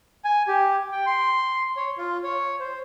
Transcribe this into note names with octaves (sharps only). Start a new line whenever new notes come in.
G#5
G4
G5
C6
C#5
F4
C#5
C5